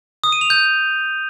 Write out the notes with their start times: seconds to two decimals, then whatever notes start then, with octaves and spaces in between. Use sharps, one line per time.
0.24 D#6
0.32 D#7
0.41 F7
0.50 G6